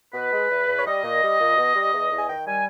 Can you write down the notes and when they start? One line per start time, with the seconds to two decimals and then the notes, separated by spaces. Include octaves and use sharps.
0.13 B2 B4
0.32 G#3
0.49 E2
0.67 E2
0.78 C#5
0.85 G3 D#5
1.03 A#2
1.21 G3
1.39 A#2
1.56 B2
1.74 G3
1.92 E2
2.10 E2
2.17 G#5
2.28 D#3 G5
2.46 G3 G#5